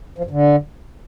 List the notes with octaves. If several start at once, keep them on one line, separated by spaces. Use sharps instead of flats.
F3
G2
D3